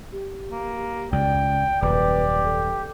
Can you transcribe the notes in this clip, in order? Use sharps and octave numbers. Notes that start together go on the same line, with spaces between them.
G4
A#3
C#2 D5 G5
D#1 F#2 A#2 G4 B4 D5
A4